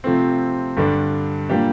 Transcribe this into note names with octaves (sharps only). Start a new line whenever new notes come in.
C3 F3 A3 C4
G2 D3 G3 D4
A#2 G3 A#3 D4 G4